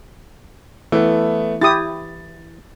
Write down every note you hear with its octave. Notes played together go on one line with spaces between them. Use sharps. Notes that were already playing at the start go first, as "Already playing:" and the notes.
E3 A3 B3
E4 G4 D#6 A6